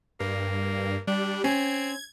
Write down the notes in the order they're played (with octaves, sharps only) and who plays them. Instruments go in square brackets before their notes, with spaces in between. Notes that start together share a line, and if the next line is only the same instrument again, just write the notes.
[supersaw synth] G2 [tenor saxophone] A#3
[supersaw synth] G3 [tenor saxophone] D4
[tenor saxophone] C4 [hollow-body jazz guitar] C#4 [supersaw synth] G#6